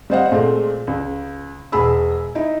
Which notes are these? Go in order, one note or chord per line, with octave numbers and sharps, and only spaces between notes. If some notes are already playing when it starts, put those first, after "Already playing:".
G3 C4 C5 D#5 F5 F#5
A#2 G#3 A3 C4
C#2
E1 G#3 G#4 B5 E6
D#4 E4